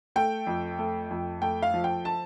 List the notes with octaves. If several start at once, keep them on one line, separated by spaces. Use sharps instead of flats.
A3 G5
F2
A3
F2
A3 G5
F5
F3
G5
A5